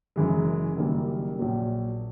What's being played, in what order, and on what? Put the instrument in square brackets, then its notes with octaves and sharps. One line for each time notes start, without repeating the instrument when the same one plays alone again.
[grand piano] F#1 F#2 C#3 E3 G#3
F#1 F#2 D#3 G3 A#3
A#1 A#2 F#3